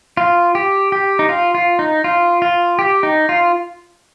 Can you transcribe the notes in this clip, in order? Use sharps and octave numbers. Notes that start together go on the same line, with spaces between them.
F4
G4
G4
D#4
F4
F4
D#4
F4
F4
G4
D#4
F4